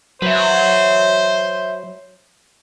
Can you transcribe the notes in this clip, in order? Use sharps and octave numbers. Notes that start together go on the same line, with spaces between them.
F#3 B4 C5 E5